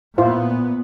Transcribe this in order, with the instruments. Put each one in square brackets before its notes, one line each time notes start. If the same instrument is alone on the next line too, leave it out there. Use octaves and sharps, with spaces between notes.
[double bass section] A#2 B3 [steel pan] E4 F4 C5